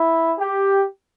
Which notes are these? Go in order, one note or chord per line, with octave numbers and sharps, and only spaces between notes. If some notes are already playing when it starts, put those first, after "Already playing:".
Already playing: E4
G4